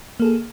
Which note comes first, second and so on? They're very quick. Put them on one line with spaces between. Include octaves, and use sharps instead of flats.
A#3 A4 G#4